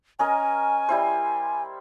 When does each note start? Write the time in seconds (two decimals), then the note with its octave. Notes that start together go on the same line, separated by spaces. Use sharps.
0.19 C#4 A#4 D#5 G#5
0.89 G3 E4 C5